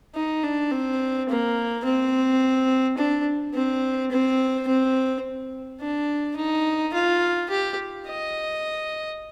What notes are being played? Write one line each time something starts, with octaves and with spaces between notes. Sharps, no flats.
D#4
D4
C4
A#3
C4
D4
C4
C4
C4
D4
D#4
F4
G4
D#5